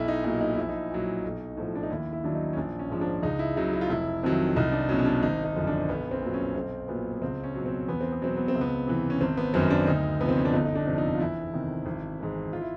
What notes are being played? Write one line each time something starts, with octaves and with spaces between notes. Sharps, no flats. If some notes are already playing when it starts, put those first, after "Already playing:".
Already playing: B1 E4
D#4
A#2 F#3 D#4
D#4
A#1 E4
D#4
A#2 F#3
B1
A2 F3
D4
D#4
D#2 E4
E4
D#3 F#3 D4
D#4
C#4
A#1 D4
C#4
G#2 F3
D4
C#2 D#4
E4
C#3 F#3 D#4
E4
F4
F1 E4
F2 C3 D#3 F#3
C2 D#4
D4
B2 F#3 C#4
C#4
D4
G#1 D#4
D#4
F#2 D3 F3
D4
B1 B3
C4
A#2 F#3
C#4
B1 C4
A#2 F#3 B3
B3
C#2 C4
C#4
B2 F#3
C4
E2 B3
C4
B3
B2 F#3 C4
B3
C4
C#2
B3
C3 E3
C#4
G#1 C4
B3
F#2 D#3 F#3 C4
D4
D2 D#4
C3 F3 B3
C4
C#4
D4
G1 D#4
D#4
D4
F2 C3
D#4
F4
E2 E4
C3 D#3
G#1
G#2 E3
F4
E4